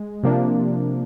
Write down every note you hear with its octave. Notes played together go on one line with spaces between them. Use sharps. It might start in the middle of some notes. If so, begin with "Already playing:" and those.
Already playing: G#3
C3 F3 A#3 D4